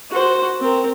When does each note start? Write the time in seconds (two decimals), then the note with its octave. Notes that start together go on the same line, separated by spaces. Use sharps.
0.10 F#4 C5
0.60 C4 A#4